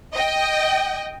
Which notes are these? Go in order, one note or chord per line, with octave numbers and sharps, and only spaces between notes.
D#5 G5